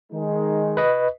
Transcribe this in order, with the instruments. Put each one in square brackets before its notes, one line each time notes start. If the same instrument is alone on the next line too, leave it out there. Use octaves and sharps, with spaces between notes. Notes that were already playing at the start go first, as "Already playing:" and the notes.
[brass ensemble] D#3 G#3 D#4
[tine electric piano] B4 D#5